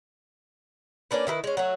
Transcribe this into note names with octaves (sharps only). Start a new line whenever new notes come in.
A#3 C#4 D4 B4
D#3 E4 A#4 B4
G#3 C#4
F#3 A3 F#4